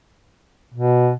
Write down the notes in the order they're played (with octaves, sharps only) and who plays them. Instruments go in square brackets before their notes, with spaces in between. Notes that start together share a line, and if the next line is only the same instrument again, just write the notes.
[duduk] B2